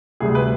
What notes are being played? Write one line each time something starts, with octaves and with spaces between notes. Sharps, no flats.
D2 C3 G3 G#4
B4